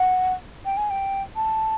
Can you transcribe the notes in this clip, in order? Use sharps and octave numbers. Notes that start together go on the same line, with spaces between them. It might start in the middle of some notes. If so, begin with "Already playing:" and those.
Already playing: F#5
G5
G#5
G5
A5